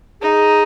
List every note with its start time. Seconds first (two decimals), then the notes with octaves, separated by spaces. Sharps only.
0.22 D#4 G#4